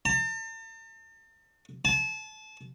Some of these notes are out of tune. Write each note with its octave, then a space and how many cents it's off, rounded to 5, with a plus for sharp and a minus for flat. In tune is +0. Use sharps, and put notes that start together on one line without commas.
A5 +40
A5 -30